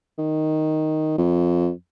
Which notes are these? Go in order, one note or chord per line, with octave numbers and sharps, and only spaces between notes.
D#3
F2